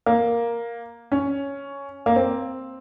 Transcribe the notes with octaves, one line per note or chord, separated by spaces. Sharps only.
A#3
C#4
A#3
C4